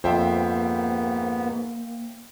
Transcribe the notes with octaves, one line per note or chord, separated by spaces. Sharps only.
F2 G#2 A#3 B3 C5 E5 G5